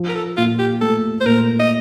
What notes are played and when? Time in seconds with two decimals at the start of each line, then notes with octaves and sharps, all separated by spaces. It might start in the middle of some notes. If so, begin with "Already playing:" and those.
Already playing: F3
0.09 A#4
0.15 A4
0.37 A#2 F4
0.59 G4
0.81 A3 A4
1.21 C5
1.26 A#2 A#4
1.59 D#5